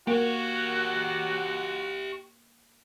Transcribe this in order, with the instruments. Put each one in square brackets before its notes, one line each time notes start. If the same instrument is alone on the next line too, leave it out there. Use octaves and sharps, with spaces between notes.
[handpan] A#3 [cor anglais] F#4 [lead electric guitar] G4 C#5